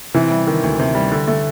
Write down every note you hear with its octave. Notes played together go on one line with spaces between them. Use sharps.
C3 E3
G3
D#3
D2
C3
G3
D3
A3